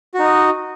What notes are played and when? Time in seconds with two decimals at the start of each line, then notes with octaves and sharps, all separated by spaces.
0.14 F#4
0.19 D#4
0.24 D#5